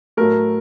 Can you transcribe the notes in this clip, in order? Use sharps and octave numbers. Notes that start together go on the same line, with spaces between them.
A2 F#3 A3 A#4